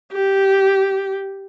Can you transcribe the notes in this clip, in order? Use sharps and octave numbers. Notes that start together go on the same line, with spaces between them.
G4